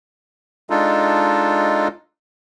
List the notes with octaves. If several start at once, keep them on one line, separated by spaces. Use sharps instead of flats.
G#3 D4 D#4 F4 A4